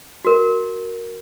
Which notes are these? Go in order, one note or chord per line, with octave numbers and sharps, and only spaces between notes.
F#4 A#4